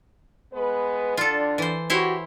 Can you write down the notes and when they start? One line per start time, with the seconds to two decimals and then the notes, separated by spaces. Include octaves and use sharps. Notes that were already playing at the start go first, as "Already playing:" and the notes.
0.53 G#3 B3 B4
1.17 D3 D4 F4 A4
1.58 E3 C5
1.90 E4 F#4 G4 C5 C#5